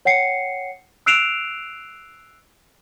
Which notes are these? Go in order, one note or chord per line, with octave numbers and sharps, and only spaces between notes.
C#5 F#5 G5 C7 C#7
E6 F#6 C7 D7 E7 F7